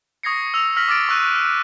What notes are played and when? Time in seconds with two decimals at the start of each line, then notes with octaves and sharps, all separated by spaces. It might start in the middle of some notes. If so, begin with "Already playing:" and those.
0.23 C#6 D#6 G#6 A#6 C7 C#7
0.54 E6 F7
0.77 F6 A#6 B6 F#7
0.88 D6 F6 A6 D7
1.09 C#6 E6 F#6 D#7
1.35 E6